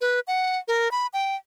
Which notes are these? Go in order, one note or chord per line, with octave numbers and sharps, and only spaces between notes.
B4
F#5
A#4
B5
G5